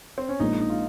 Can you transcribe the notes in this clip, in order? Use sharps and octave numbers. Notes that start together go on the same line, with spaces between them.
C4
C#4
A#1 A#2 G#3 D#4
D#4
F4